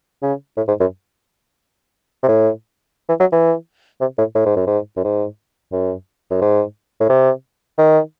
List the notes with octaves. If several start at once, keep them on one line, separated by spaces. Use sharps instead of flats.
C#3
A2
G#2
F#2
C3
A2
E3
F#3
E3
C3
A2
A2
G#2
F#2
G#2
F#2
G#2
F#2
F#2
G#2
A2
C3
D#3